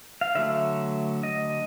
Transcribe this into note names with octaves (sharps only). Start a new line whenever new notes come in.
F5
D3 F#3 A3 E5
D#5